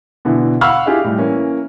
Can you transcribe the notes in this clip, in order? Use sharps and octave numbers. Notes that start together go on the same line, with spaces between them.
B2 D3 E3
F5 F#5 B5 C#6 E6 F6
E4 F4 G4 G#4 D#5
A2 G3
E3 A#3 C#4